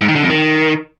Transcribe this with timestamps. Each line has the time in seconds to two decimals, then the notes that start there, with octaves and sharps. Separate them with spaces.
0.01 G#2
0.08 D#3
0.16 D3
0.23 F2
0.30 D#3